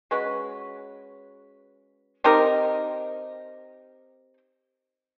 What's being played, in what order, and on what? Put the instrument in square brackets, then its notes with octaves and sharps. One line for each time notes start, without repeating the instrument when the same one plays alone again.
[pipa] G#3 C#4 F#4 B4
C4 D#4 G4 A#4